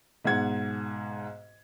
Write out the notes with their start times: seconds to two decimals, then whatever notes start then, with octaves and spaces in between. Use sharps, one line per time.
0.24 B1 G#2 F#5 G#6